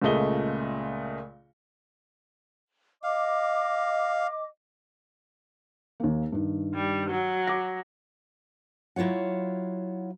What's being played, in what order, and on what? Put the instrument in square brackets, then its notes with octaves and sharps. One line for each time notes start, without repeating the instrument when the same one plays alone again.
[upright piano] C#2 A#2 C#3 A3 D#5 G7
[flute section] D#5 D6 [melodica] F5
[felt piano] D#2 A#3
G2 D#3
[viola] G3
F#3
[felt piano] D6 A#6
[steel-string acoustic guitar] F#3 E4 F4 C#5 F#5